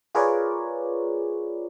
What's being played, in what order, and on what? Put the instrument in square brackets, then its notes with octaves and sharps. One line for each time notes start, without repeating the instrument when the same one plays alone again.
[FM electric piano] F4 G#4 A#4 B4 C#5 D5